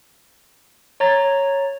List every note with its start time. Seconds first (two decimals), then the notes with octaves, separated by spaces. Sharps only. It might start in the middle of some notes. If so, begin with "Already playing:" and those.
1.00 C#5 A#5 A6